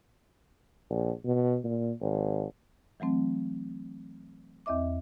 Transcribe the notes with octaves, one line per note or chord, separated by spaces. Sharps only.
A#1
B2
A#2
G#1
E3 F#3 A3 C4
E2 C4 D#5 E5 D6